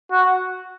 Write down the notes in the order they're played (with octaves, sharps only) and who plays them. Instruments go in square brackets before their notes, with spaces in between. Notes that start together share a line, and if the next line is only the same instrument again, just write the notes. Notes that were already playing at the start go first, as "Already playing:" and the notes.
[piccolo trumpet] F#4